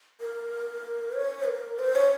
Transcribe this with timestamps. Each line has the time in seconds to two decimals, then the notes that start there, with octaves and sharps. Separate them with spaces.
0.21 A#4
1.16 C#5
1.47 A#4
1.79 C5
1.95 C#5